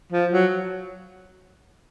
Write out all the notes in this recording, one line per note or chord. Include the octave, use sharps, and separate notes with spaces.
F3
F#3